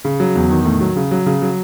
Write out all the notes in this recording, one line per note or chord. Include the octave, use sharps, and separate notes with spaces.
C#3
F#3
E2
D#3
A2
F#3
C#3
F#3
C#3
F#3